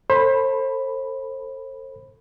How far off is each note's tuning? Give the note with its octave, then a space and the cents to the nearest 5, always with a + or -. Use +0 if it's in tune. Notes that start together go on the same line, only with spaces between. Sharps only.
A4 +35 C5 +30 B5 +0